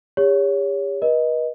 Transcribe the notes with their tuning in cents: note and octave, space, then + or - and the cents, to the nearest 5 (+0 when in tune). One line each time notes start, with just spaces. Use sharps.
G4 +45 C#5 +20
B4 -40 D#5 +5